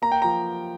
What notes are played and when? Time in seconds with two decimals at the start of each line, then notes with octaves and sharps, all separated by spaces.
0.02 A#3 A#5
0.12 G5
0.22 F3 A#5